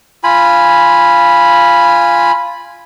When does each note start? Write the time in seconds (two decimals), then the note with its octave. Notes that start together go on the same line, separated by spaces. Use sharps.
0.24 F4 G#5 B5